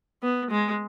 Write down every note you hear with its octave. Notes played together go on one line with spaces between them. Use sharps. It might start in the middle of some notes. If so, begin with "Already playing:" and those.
B3
G#3